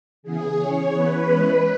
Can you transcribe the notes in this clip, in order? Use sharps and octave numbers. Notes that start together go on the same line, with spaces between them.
C#3 E3 B3 G#4
E3 C#4 C#5
E3 B3 B4
E3 G#3 C#4